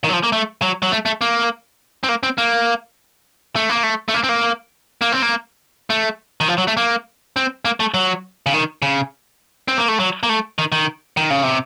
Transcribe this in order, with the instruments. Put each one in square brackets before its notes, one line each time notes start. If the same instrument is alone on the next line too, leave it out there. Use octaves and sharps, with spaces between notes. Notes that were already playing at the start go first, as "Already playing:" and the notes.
[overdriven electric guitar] D#3
F#3
F3
A#3
A3
F#3
F#3
A3
A3
A#3
C4
A#3
C4
A#3
A3
A#3
A3
A3
A#3
C4
A#3
A#3
C4
A#3
A3
D#3
F3
F#3
A3
A#3
C4
A#3
A3
F#3
C#3
D#3
C#3
C4
A#3
A3
F#3
A#3
A3
D#3
D#3
D#3
C#3
C3